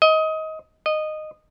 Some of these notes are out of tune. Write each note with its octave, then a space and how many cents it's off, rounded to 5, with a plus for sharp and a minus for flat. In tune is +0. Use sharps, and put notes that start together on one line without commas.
D#5 +20
D#5 -15